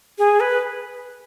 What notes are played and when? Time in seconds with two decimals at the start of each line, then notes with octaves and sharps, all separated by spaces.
0.18 G#4
0.40 B4